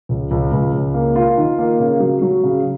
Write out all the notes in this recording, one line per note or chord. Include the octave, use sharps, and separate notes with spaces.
C#2
C#2
C#2
C#2
A#3
F4
D#3
A#3
C#3
F#3
F#3
C#3